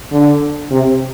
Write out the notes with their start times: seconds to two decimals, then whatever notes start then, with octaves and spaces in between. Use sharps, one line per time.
0.12 D3
0.71 C3